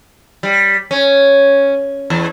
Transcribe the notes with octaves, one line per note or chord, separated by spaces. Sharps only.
G3
C#4
E2